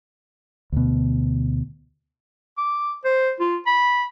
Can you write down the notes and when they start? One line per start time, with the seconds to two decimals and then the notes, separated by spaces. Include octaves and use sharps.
0.72 D2 B2
2.58 D6
3.05 C5
3.40 F4
3.67 B5